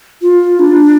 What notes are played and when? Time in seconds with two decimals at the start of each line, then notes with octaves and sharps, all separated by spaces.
0.22 F4
0.59 D4